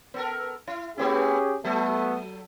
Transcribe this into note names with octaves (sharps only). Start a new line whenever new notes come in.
B3 A4 A#4
E4
A3 B3 C#4 E4 G4 G#4
F#3 A3 B3 A4